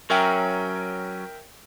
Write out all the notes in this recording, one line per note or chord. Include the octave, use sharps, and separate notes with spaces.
F#3 C#4 A#4 E5 G5